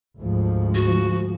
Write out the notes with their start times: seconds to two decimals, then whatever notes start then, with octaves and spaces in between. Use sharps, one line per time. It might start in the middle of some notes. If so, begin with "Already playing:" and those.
0.20 D2 G#2 F3
0.75 F#4